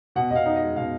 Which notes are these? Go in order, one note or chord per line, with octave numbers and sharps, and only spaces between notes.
B2 F#5
B2 D#5 F5
D#4
D#5
G#3
B2 F5